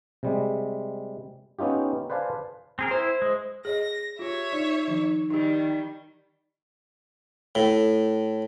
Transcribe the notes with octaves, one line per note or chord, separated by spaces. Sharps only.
C3 G3 G#3
B3 C#4 D#4 F4 G4
B4 C5 D5 F5 G#5 A5
C4 G#4 A#4
E4 C5
G#3
G#4 C#5 D#5 A#6
F4 G4 C#5 E5
D#4 D5
D#3 F3 D#4
D#3 G3 D#4 G4
A2